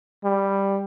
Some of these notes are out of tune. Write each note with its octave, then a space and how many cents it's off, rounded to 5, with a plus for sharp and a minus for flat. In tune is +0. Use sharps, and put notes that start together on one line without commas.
G3 +5